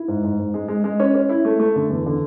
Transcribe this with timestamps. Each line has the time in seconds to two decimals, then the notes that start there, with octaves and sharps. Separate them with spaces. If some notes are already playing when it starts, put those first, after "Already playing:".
Already playing: E4
0.08 G#2
0.23 G#2
0.39 G#2
0.54 G#3
0.68 G#3
0.84 G#3
1.00 C#4
1.15 C#4
1.29 E4
1.45 A3
1.60 A3
1.76 D3
1.90 E2
2.06 D3